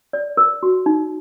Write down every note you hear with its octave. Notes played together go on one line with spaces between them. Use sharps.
D5
A#4
F#4
D#4